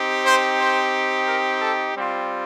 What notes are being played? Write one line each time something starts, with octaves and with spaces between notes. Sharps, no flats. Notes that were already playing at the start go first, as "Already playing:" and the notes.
Already playing: C4 D#4 G4
C5
C5
A#4
A4
G3 C4 F4